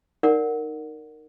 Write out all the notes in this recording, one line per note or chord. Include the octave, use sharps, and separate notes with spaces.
D#4 A#4 D5 F#5